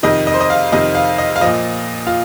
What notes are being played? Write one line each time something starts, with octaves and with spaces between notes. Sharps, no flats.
F2 C3 D#3 D#5
D#5
C5
D#5
F5
F2 C3 D#3 D#5
F5
D#5
F5
A#2 F3 D#5
F4